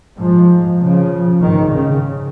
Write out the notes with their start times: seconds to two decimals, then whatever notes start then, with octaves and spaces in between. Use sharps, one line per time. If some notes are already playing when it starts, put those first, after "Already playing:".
0.16 G#2 F3 G#3
0.79 C#3 F3
1.41 G#2 D#3
1.73 C#3